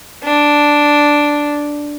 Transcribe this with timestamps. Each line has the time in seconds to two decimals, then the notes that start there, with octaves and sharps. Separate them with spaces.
0.23 D4